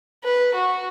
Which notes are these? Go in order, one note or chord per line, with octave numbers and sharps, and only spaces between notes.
B4
F#4